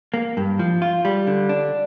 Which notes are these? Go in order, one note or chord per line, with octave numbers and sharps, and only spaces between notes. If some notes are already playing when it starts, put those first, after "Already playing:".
A#3
G2
F3
F4
G3
D3
D4